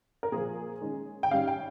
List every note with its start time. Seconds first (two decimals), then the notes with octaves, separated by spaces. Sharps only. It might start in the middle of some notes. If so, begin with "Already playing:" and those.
0.23 A#4
0.32 A#2 F3 A#3 G#4
0.82 D#3 G#3 C#4
1.23 G5
1.31 G#2 G3 C#4 F5
1.48 G5